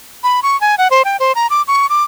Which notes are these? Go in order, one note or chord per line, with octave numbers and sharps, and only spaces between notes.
B5
C#6
G#5
F#5
C5
G5
C5
A#5
D6
C#6
D6